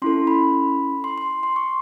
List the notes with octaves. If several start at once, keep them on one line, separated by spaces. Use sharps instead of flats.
C#4 E4 A4 C6
B5
C6
C6
C6
C#6